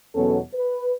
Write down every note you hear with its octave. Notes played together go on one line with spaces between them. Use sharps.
E2 B2 F#3 B3 C#4 A4
B4